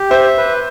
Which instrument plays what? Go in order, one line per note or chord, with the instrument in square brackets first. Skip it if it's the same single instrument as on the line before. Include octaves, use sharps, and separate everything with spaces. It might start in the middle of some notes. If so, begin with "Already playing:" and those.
Already playing: [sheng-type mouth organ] G4
[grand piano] C5 [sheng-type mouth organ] E5
[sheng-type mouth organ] B4